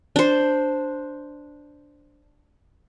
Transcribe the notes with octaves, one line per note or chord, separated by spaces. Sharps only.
D4 C5